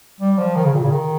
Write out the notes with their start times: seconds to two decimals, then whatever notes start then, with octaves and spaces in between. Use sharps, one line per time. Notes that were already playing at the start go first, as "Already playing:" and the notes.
0.21 G3
0.38 F3
0.55 D#3
0.64 C#3
0.74 A#2
0.81 C#3
0.91 D#3